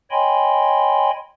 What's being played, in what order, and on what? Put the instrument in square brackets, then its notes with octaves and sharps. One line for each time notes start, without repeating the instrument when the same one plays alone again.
[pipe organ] C#5 D#5 G5 G#5 B5 C6